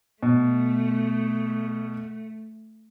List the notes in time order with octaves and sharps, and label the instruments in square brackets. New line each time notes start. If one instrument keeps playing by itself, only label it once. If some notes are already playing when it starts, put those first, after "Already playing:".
[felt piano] B2 [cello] A3